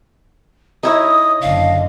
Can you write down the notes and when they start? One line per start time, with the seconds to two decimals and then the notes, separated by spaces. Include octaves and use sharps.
0.83 D#4 E4 C#5 D#5 D#6
1.42 F#1 D3 F5